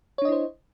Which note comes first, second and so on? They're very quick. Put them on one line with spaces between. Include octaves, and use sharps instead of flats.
C#5 D4 D#5 E4 C5